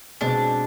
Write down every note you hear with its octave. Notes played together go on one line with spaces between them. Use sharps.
B2 G#3 C4 D4